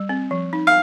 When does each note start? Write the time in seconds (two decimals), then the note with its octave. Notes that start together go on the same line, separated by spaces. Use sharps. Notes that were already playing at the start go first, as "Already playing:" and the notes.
Already playing: G3
0.09 C4
0.31 F3
0.53 D#4
0.67 F5